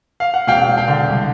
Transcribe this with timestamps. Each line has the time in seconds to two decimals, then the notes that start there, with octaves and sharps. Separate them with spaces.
0.20 F5
0.34 F#5
0.47 E1 F5 G5
0.68 E1
0.77 F5 G5
0.88 D3
1.07 C2